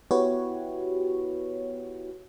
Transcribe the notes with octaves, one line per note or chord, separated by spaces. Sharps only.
B3 E4 F#4 G4 B4 C#5